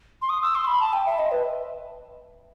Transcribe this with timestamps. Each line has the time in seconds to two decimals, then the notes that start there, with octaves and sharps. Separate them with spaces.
0.22 C6
0.29 D#6
0.42 E6
0.55 C6
0.67 B5
0.80 A5
0.93 G5
1.06 E5
1.18 D#5
1.31 B4